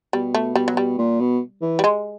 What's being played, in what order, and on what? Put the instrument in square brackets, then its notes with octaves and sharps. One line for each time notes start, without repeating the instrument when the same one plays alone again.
[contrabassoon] B2 [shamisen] G3
[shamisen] A3
[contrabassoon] B2 [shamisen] G3
[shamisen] F#3
G3
[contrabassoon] A#2
B2
E3
[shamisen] G3
G#3